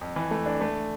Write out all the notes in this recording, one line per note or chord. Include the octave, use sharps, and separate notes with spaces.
F2
E3
A3
D4
A3